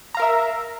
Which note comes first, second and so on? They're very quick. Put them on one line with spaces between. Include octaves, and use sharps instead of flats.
A#5 F5 A#4 E5